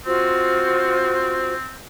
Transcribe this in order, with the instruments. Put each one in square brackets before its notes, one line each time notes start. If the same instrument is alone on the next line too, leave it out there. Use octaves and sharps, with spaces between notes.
[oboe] C4 [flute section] F4 F#4 C5